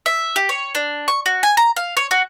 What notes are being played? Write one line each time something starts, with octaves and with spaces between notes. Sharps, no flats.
E5
G4
C#5
D4
C#6
F#4
G#5
A#5
F5
C#5
F#4